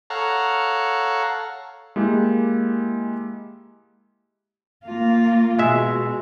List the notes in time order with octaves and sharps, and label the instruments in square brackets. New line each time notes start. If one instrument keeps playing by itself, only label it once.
[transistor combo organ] A4 C#5 F5 F#5 A#5
[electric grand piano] G#3 A#3 E4 G4
[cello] A#3 F4
[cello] B2 [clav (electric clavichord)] G#3 E5